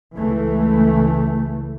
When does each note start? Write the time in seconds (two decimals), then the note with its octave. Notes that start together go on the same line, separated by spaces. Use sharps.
0.17 C#2 E3 A3